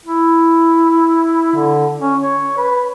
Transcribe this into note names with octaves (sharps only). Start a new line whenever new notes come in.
E4
D3
C#4
C#5
B4